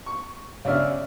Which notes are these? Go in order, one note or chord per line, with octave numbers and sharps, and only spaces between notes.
C#6
C#3 D4 D5 E5 F6